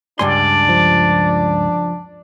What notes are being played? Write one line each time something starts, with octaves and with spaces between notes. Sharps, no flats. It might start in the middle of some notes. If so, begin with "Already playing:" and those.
C#2 G2 D4 D5 G#5 C6
F3